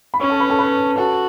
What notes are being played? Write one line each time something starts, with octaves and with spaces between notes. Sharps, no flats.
B5
C#4 C#5 C#6
A4 A5
B4 B5
A4 A5
B4 B5
F#4 A4 A5